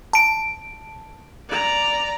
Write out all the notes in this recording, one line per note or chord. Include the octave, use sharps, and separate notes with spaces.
A5 D7
D5 A#5